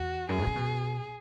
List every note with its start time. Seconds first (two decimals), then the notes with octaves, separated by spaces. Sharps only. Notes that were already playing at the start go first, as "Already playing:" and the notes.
Already playing: E2 F#4
0.29 F#2 G#4
0.38 E2
0.43 B2
0.47 C#3
0.55 B2